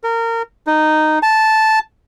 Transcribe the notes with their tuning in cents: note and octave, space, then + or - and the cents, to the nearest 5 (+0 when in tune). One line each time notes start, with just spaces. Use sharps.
A#4 -25
D#4 -10
A5 -5